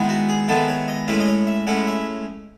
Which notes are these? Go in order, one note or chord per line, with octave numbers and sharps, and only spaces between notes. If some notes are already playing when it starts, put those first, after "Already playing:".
Already playing: D#3 G#3 B3 E4
F#4
G#4
D#3 G#3 B3 E4 A4
C#5
D#5
A2 G#3 C#4 E4 B4
D#5
C#5
E5
A2 G#3 C#4 E4 F#5
E5